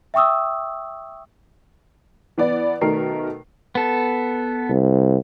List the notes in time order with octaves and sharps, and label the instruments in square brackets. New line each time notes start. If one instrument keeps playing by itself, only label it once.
[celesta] E5 G5 C#6 D#6 E6
[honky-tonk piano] E3 B3 D5
B2 D#3 A3 A#4 C7
[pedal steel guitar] B3 A4
[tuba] C2